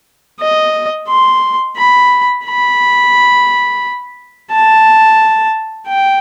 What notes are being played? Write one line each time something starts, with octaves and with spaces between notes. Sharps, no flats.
D#5
C6
B5
B5
A5
G5